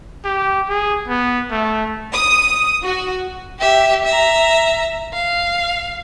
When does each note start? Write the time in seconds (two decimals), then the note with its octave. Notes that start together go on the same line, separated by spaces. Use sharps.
0.24 G4
0.69 G#4
1.08 B3
1.51 A3
2.14 D#6
2.83 F#4
3.60 G4 E5
4.05 E5 A#5
5.13 F5